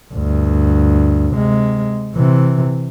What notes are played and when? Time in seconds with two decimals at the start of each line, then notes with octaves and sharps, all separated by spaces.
0.13 D2 G2
1.32 C3 G#3
2.15 C3 E3